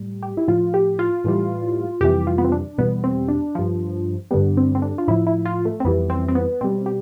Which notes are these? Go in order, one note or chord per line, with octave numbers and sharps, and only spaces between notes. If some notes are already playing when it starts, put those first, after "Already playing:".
Already playing: A2 G3
G4
E4
A2 F3 F4
G4
F4
A2 E3 G3
F2 C3 E3 G3 G4
F4
B3
C4
D4
E2 B2 G3 B3
C4
D4
G2 F3
G2 D3 G3 B3
C4
C4
D4
F4
A2 F3 E4
E4
F4
A3
C4
F2 E3 G3 B3
C4
C4
B3
B2 G3 C4
G4